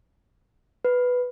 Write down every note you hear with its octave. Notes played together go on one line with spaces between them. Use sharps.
B4